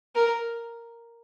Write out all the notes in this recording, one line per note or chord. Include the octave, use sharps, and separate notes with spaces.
A#4